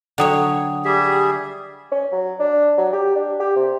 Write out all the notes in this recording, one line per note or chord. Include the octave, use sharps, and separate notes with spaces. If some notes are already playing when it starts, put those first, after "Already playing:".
D3 F#3 C#5 F#5 G5 D#6
G3 G4 G#4 E5
C#4
F#3
D4
F#3
G4
D4
G4
C3